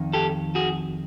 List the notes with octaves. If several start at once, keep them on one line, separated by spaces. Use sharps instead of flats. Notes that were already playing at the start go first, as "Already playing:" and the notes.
Already playing: F2 D#3
G4 A4
F#4 G#4